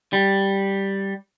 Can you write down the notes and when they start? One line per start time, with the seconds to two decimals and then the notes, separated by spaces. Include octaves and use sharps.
0.13 G3